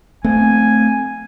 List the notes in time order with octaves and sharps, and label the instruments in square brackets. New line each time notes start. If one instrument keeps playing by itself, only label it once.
[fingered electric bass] A3 C4 [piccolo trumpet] G#5